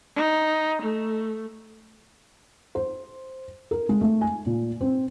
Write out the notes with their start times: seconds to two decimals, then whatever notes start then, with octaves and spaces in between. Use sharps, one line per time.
0.16 D#4
0.82 A3
2.75 C5
3.71 A#4
3.89 G#3
4.01 A3
4.21 G#5
4.46 A#2
4.81 C4